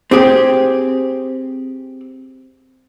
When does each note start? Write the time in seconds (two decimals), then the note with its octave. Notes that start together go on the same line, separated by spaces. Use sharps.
0.11 C4 G4 G#4